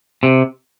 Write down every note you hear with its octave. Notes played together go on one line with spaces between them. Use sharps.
C3